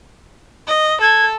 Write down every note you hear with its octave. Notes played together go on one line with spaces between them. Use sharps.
D#5
A4 G#6